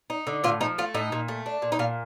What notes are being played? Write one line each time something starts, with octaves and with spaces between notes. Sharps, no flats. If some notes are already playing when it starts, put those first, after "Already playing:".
D#4
D3
A2 F4
F3 D#4
A3 F4
A2 D#4
A#2
A3
D4
A#2
D#4
A#2 F4